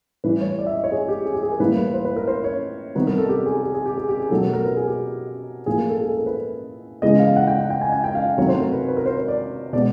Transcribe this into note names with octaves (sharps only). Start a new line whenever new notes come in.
A2 E3 G3 B4
C#5
D5
E5
D#5
C#5
G#4
G4
G#4
G4
G#4
A#4
A2 E3 G3 A#3 B4
B4
C5
B4
A#4
C5
C#5
C3 D#3 G3 B3 B4
A#4
A4
G4
G#4
G#4
G#4
G4
G#4
G4
G#4
B2 F#3 A3 A4
A#4
A#4
B4
G#4
G4
A2 F3 A#3 G#4
A#4
A4
G#4
A4
A#4
B4
C#3 E3 G#3 B3 D#5
F5
F#5
G5
F#5
G5
G#5
G#5
G5
F5
C3 D#3 F#3 A3 C#5
C5
A#4
B4
B4
A#4
C5
C#5
D5
B2 G#3 B3 D5